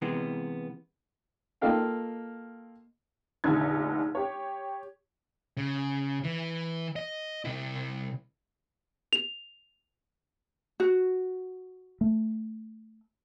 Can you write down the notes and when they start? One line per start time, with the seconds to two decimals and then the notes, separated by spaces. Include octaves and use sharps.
0.02 C3 E3 G#3 B3
1.61 A#3 F4 A4 D#5 F5 G5
3.44 F1 A#1 D3 D#4 G#6
4.15 G4 C#5
5.57 C#3
6.24 E3
6.96 D#5
7.45 C3 E4
9.13 F7
10.80 F#4
12.01 A3